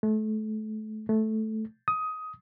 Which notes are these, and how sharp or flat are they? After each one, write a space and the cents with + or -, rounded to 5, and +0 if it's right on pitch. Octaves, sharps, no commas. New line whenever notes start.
A3 -30
A3 -10
D#6 +15